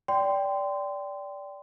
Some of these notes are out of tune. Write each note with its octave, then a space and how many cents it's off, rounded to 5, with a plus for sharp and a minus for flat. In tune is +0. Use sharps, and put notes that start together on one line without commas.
D5 -20 G5 +0 C6 -25